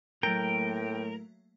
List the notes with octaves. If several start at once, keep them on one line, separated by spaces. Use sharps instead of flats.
A2 F#3 A3 A#3 A#4 G5